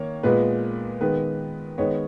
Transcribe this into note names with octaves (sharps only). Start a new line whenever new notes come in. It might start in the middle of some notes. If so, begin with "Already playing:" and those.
Already playing: D#3 A#3 C#5
A#2 G#3 B3 B4
D#3 G#3 B3 B4
D#3 G#3 B3 C#5